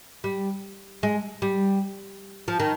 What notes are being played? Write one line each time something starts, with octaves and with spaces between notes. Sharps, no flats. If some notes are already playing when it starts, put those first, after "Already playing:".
G3
G#3
G3
F3
D#3